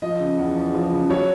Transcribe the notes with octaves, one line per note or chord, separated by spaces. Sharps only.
F3 D#5
C#3
E2
E2
F3
C#3
F#3 C#5